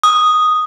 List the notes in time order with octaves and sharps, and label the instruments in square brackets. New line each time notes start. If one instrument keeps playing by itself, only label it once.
[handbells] D#6